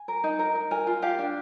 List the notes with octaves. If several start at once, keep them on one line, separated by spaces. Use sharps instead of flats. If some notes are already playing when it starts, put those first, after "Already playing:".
Already playing: G#5
A#4
D#4
A#4
D#4
A#4 G#5
F4
G4 F5
D4